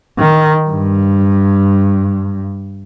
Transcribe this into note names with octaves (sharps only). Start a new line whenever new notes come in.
D#3
G2